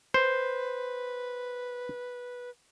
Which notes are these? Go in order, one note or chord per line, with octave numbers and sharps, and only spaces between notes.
B4 C5